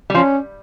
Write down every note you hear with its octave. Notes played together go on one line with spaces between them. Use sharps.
G3
F3 C#4